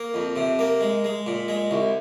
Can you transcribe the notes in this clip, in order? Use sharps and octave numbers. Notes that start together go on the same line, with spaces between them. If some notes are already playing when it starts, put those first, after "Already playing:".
Already playing: A#3
F2
C3
A#3
G#3
G#3
A#2
G#3
C2